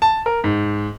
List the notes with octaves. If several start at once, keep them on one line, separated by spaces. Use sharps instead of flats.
A5
A#4
G#2